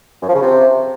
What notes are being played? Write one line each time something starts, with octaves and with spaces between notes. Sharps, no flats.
F#2
F3
C#3
C3